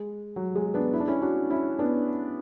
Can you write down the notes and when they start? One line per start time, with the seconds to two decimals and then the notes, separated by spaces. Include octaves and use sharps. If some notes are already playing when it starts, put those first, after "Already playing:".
Already playing: G#3
0.36 F#3
0.56 G#3
0.74 B3 D4
0.94 E4
1.00 D4
1.08 C#4 E4
1.22 D4 F#4
1.50 C#4 E4
1.79 B3 D4